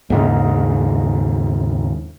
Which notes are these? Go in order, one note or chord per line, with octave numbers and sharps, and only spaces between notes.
D#2 G#2 C#3